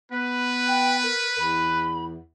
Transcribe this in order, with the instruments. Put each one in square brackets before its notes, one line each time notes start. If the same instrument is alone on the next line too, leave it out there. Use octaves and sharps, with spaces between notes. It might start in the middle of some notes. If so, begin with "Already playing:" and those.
[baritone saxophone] B3 [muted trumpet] B4
[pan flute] G5
A#4
[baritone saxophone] E2 [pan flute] B5